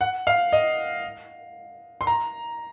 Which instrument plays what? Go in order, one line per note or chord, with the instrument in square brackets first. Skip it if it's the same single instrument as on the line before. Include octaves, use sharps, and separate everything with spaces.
[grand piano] F#5
F5
D#5
C6
A#5